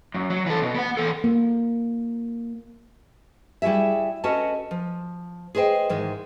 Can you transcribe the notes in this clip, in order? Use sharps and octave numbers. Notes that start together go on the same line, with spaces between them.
F#2
F#3
E3 A4
B2
B3 F#5
E3 A4
A#3
G3 E4 F#4 G#4 E5
C#4 F#4 A4 B4 D#5 A5
F3
G#4 B4 C5 D#5 G5
G#2 D#3 E3 G#3